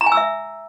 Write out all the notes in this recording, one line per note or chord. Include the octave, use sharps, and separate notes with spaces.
A#5
G#5
E6
E5